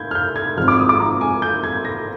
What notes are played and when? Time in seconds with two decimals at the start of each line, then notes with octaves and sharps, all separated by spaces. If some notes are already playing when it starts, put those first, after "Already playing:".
Already playing: G6 G#6
0.11 F6
0.15 G6
0.36 G#6
0.57 G#1 G#2 F3 G#3 C4 F6
0.68 D6
0.79 D#6
0.89 D6
1.00 A#5
1.21 G#5
1.42 G6
1.64 G#6
1.85 A#6